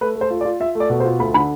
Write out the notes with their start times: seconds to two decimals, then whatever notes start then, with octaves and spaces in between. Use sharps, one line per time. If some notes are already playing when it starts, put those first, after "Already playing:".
0.01 A3 B4
0.15 A3
0.21 C5
0.31 F4
0.41 D5
0.45 F4
0.60 F4 E5
0.75 A3
0.80 D5
0.90 B2
1.00 C5
1.05 F4
1.19 D2 B5
1.34 D3 B5